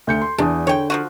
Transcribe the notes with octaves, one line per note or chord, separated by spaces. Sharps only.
D2 G6 C#7
C6
E2 D4 D#6
D3 C#5 G5
F3 F4 F#4